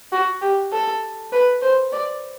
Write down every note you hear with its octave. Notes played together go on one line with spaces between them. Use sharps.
F#4
G4
A4
B4
C5
D5